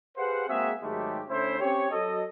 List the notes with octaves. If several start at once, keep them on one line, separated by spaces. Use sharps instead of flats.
G4 G#4 B4 C5 F5 F#5
G#3 A#3 C4 F#4 G#4 E5
G#2 D#3 F#3 G#3 A3 G4
D3 A3 C#4 E4 C5
C4 C#4 G4 C#5
F#3 A4 D#5